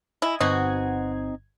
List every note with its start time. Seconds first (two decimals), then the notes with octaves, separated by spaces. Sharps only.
0.22 E4 D#5 G#5
0.41 G1 B2 C4 D#4 F#4 D#5 G#6